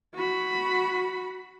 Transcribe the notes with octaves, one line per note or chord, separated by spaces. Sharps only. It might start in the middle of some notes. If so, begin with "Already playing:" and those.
F#4 B5